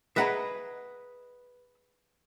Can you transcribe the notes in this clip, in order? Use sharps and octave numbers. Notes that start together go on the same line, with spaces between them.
G#4 B4 D#5 E5 F#5 A#5